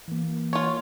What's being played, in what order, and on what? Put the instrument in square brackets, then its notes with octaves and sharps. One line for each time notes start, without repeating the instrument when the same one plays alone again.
[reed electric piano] E3 A#3
[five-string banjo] F4 C#5